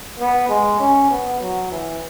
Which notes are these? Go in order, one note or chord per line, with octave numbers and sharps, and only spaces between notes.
B3
G#3
C#4
B3
F#3
E3